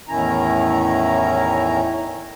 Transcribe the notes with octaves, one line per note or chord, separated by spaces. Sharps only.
E2 A2 D#3 C#4 E4 A#5